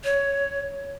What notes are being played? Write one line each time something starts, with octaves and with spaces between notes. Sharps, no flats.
C#5